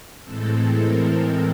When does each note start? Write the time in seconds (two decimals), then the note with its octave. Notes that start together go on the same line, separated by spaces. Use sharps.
0.24 A2 E3 G#3 C4 A4
0.77 A#4